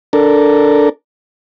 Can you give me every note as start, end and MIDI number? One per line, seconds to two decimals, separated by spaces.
0.13 0.89 62
0.13 0.89 69
0.13 0.89 70